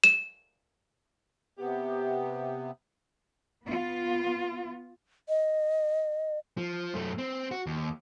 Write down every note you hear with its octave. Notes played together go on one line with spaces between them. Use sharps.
E7
C3 B3 G4
B3 F4
D#5
F3
F#2 A3
C4
F#4
D#2